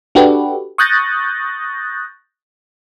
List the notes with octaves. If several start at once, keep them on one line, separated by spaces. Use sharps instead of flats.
D4 F#4 G4 A4 B4
C#6 D#6 F#6 G6 A6 A#6